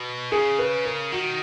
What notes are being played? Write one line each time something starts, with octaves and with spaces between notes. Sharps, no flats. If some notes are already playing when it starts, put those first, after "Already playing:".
Already playing: B2
C#3 G#4
B4
A#4
D#3 F#4